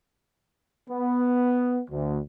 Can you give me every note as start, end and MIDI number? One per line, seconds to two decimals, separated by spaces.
0.90 1.80 59
1.90 2.18 38